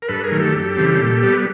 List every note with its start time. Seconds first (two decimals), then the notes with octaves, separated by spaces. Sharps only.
0.02 A#4
0.08 G2 A4 B4
0.24 G#4 A#4
0.31 D#3 F#3 A3
0.39 G4 A4
0.54 F#2
0.77 C#3 E3 G3 C4
1.00 A#2
1.23 G3 B3